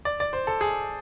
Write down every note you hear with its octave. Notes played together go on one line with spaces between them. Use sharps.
D5
D5
C5
A4
G#4